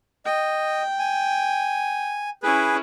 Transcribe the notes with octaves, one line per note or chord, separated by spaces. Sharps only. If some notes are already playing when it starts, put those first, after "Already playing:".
D#5 G5
G#5
C#4 E4 G#4 B4